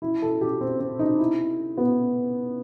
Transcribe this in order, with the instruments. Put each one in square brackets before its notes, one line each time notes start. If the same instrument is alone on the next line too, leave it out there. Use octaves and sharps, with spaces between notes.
[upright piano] E4
A4
G4
C4
C4
D#4
E4
B3